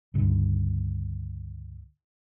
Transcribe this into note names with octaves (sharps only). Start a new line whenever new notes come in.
C#2 G2 D3